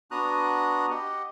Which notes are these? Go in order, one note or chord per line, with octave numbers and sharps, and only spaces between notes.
B3 D4 F#4 A#5 D#6 F#6
G4 D#5 F#5